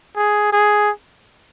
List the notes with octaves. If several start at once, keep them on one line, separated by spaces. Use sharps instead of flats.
G#4
G#4